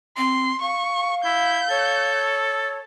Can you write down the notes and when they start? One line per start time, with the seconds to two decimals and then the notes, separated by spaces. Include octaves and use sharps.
0.17 C4 C6
0.61 F5 C#6
1.25 E4 G6
1.70 A4 C#5